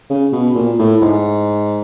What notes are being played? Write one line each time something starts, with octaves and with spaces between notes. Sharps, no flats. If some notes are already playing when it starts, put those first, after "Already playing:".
C#3
B2
A#2
A2
G#2